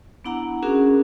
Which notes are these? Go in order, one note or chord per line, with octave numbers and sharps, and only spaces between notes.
B3 D4 E4 F#5 A#5
C#4 D4 F#4 G#4 A#4